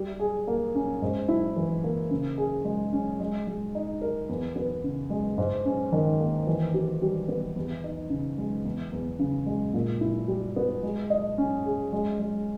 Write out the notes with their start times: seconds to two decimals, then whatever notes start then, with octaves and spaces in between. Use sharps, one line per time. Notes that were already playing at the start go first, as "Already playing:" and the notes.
Already playing: G3
0.20 G#4
0.47 A#3
0.75 C#4
1.02 G#2
1.28 E4
1.56 E3
1.84 A#3
2.11 C#3
2.38 G#4
2.65 G#3
2.93 C#4
3.20 G#3
3.47 G#3
3.75 D#4
4.02 A#4
4.29 E2
4.56 B3
4.84 C#3
5.10 G#3
5.38 G#2
5.65 C#4
5.92 D#3
6.20 A#3
6.47 E3
6.74 G4
7.02 G3
7.28 B3
7.56 E2
7.84 D#4
8.10 C#3
8.38 G#3
8.65 E2
8.92 E2
9.19 C#3
9.46 G#3
9.74 A#2
10.01 E4
10.28 G3
10.56 B3
10.83 G#3
11.10 D#5
11.38 C#4
11.65 G#4
11.93 G#3
12.19 G#3